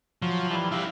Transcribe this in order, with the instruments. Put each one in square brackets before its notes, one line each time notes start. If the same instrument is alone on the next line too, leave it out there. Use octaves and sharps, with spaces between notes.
[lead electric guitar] F3 [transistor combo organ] F#3 F4
[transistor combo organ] E3 G3
[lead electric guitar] E4 G4 [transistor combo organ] E5 F5